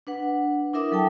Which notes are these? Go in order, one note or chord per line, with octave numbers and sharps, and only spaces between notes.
D4 B4 F#5
D4 E4 A#4 E5 D6 D#6
F#3 A4 G5 A5